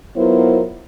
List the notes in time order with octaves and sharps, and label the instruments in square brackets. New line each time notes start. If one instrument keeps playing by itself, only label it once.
[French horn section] F#3 B3 E4 F4 A#4 C5